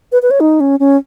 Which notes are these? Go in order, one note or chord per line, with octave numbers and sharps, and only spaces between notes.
B4
B4
C#5
D#4
C#4
C#4